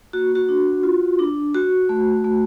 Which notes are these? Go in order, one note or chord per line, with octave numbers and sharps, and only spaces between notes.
A#3 F#4
F#4
D4
F4
D4
F#4
A3
A3